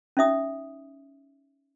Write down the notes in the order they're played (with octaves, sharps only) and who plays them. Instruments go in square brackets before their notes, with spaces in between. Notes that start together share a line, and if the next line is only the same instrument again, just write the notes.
[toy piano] C#4 D#4 E5 D#6